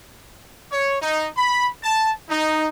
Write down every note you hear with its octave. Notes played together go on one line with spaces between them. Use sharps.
C#5
D#4
B5
A5
D#4